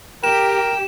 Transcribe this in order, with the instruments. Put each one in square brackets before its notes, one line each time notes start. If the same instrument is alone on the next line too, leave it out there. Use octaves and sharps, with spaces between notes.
[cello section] G4 [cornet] A#4 [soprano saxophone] G5 [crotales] E7